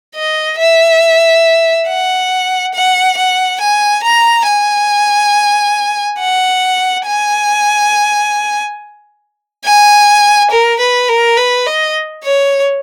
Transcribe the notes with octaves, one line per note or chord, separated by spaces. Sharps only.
D#5
E5
F#5
F#5
F#5
G#5
A#5
G#5
F#5
G#5
G#5
A#4
B4
A#4
B4
D#5
C#5